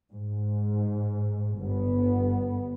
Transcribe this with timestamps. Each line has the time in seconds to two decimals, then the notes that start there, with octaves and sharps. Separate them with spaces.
0.12 G#2
1.61 G1 B3